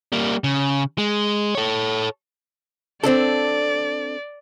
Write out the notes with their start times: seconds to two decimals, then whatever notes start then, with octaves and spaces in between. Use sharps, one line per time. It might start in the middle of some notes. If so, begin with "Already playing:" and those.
0.12 G3 A#3
0.44 C#3
0.98 G#3
1.55 A4 C#5
3.04 C4 D4 A4 D5